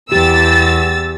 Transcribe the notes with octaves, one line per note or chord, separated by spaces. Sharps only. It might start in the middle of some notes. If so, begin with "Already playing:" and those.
E2 G4 E6 A6